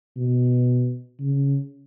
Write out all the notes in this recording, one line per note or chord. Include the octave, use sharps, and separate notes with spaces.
B2
C#3